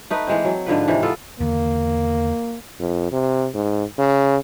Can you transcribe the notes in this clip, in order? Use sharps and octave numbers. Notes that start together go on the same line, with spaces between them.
A3 D#4 B4
E3 G#3 C4
F#3
G#2 D3 F3 B4
C3 D#3 E3
B3 F4 A4
E2 D3 D#3 A#3
F2
C3
G#2
C#3